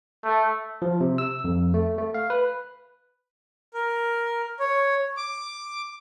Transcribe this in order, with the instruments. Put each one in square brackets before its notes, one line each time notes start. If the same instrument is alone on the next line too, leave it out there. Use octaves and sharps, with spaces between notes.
[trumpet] A3
[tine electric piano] F3
C3
E6
F2
A3
A3
F5
B4
[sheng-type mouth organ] A#4
C#5
D6